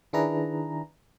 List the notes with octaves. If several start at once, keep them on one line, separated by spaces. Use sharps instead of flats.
D#3 D4 E4 G#4 B4 A#5